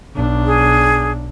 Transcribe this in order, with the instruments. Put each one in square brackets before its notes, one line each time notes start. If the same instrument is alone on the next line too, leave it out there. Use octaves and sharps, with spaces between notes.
[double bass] B1 D4
[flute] G#4